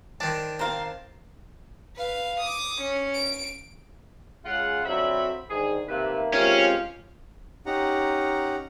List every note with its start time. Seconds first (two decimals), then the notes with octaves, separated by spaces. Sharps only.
0.20 D#3 D4 C5 A5
0.59 C4 A#4 C5 F5
1.96 B4 F5
2.40 D6 D#6
2.81 C#4
3.14 D7
4.45 C#3 G#3 F4 F#5
4.85 F2 D3 F#3 C4 E5 B5
5.49 G#2 D3 D#3 G#4
5.88 C3 D#3 A3 A#3 B4
6.33 G#3 C4 C#4 F4 G4 A#4 F5
7.66 C#4 D#4 G4 F#5 A#5